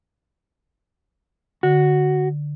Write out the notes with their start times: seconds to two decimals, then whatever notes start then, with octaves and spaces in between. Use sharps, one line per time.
1.63 D3 F#4